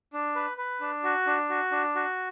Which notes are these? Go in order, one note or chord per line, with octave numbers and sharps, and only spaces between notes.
D4
B4
B4
D4
F#4
D4
F#4
D4
F#4